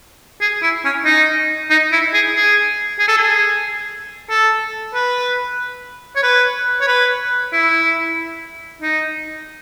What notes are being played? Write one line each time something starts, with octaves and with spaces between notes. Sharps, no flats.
G#4
E4
C#4
D#4
D#4
E4
G#4
G#4
G#4
A4
G#4
A4
B4
C#5
B4
C#5
B4
E4
D#4